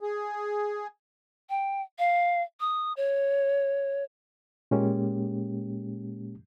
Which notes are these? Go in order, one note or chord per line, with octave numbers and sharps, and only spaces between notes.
G#4
G5
F5
D#6
C#5
A#2 G#3 A#3 C#4 G4